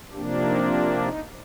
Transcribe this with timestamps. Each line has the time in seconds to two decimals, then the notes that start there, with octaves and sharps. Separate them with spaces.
0.13 C3 F3 A#3 D4 G4
0.43 D#4
1.02 D#4